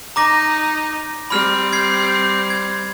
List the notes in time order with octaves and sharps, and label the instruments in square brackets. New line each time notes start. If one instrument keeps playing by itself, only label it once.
[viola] D#4 [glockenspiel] A#5 D6 A#6
[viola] G3 C4 [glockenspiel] B5 F6
[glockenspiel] G#6 C7
G#6